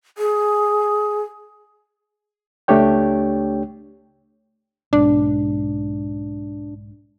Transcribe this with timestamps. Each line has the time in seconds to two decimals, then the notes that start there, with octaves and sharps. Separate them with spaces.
0.18 G#4
2.68 C#2 A3 D4 G4 C#5 G5
4.93 B1 G#2 D4